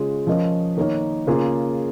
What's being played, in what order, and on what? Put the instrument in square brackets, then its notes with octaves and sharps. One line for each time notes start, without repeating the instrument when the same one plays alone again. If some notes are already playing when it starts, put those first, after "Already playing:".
Already playing: [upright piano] C#3 G#3 F4
F3 C#4 A#4 D#5
D#3 A#3 D#4 A#4 C#5
C#3 A#3 F4 G#4